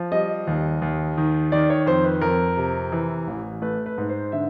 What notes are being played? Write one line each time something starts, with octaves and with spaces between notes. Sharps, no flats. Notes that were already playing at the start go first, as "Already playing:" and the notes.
Already playing: F3
G3 D#5
D#2
D#2
D#3
D#3 D5
C#5
F2 C5
B4
F2 A#4
C3
E3
A1
A3 B4
B4
G#2
C5
D3 E5